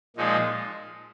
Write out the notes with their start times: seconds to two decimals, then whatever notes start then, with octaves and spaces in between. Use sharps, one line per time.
0.16 A#2 F3 G#3 D#4